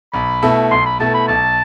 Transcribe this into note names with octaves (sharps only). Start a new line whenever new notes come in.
B1 B5
B2 A3 E4 A4
B1 C6
B5
B2 A3 E4 A4 A5
B5
B1 A5